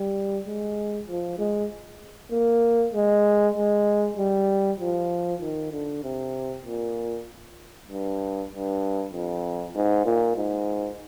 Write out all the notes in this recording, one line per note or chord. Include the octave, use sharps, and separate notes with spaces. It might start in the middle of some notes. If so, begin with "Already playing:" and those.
Already playing: G3
G#3
F3
G#3
A#3
G#3
G#3
G3
F3
D#3
D3
C3
A#2
G2
G2
F2
G#2
A#2
G#2